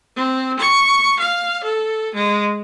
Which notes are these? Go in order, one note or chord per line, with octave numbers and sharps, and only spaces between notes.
C4
C#6
F5
A4
G#3